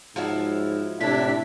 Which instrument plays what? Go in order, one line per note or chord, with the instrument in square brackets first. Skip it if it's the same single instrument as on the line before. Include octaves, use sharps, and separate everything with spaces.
[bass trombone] G#2 [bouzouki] F3 F#3 E4
[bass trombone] A2 [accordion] C3 D4 [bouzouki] E4 F4 [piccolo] B6